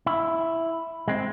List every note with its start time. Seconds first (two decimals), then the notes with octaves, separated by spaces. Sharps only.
0.06 E4
1.08 G#3 C4